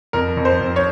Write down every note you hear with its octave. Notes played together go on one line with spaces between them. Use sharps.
F2 A#4
F2
C5
F2
C#5